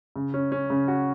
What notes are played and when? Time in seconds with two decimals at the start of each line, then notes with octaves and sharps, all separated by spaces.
0.16 C#3
0.34 C#4
0.52 C#4
0.70 C#3
0.88 F#4